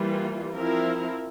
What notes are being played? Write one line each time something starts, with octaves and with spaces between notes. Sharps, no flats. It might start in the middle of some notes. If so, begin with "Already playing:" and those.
Already playing: E3 G3 A#3 F4
F3 C4 E4 A#4